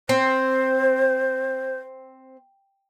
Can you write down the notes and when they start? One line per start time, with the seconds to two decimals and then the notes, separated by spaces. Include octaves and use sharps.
0.09 C4 C5